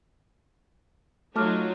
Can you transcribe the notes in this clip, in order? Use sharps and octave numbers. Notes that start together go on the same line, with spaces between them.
F#3 A3 D#4 F4 A5 D6 F6